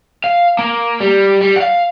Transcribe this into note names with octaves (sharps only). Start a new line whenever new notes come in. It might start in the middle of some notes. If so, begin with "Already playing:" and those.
F5
A#3
G3
G3
F5 F#5